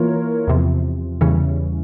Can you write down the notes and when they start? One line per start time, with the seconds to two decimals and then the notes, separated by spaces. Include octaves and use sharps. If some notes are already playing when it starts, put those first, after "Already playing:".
Already playing: E3 A#3 F4 A#4 C#5
0.47 E2 C3 F3
1.21 E2 C#3 E3 G3 C#4